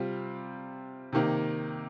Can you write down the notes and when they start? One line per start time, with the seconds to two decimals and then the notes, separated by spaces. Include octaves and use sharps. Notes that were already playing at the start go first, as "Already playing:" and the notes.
Already playing: C3 G3 C4 F4
1.13 C3 D#3 A#3